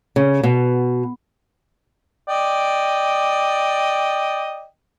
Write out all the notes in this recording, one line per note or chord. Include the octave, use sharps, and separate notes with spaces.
C#3
B2
D5 D#5 G5